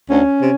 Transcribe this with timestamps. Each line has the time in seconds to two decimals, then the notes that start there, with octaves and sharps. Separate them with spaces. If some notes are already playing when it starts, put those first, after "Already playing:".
0.09 D2 C#4
0.40 C3